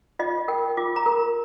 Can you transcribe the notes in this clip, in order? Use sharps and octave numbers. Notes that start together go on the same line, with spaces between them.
F4 D#5
A#4 G5
F4 D6
A#5
A#4